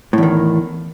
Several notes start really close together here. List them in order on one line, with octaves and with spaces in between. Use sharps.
A2 E2 D#3